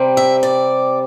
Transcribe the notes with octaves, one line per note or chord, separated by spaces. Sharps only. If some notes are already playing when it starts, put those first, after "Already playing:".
Already playing: C3 G3 C4
E5
D5